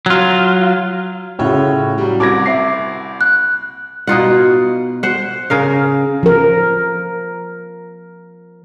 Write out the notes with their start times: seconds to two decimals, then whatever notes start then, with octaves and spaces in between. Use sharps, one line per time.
0.06 F#3 F4
1.39 A2 C#3 F4 F#4 C#5
1.98 F#3 G3
2.20 C2 F#4 D6 G#6 A#6
2.46 E5 D6 C7
3.21 F#6
4.07 B2 D#4 F4 F#5
5.03 C5 F#5
5.50 C#3 A#4 F5
6.23 F3 A#4